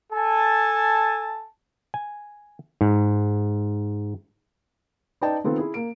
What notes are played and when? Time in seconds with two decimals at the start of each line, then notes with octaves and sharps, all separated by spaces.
0.12 A4 G#5 A5
1.94 G#5
2.81 G#2
5.21 D#4 B4 D5 D#5 G5 A5
5.44 D#3 F3 B3 C4 A4
5.58 E4 G#4
5.74 A#3 D7